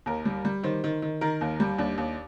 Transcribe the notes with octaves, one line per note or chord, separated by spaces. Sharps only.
D#2 A#4
G3
G3
D#3 C5
D#3
D#3
D#3 A#4
D#2
G3
D#2 D4
D#2